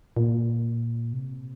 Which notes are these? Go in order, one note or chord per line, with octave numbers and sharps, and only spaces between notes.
A#2
C3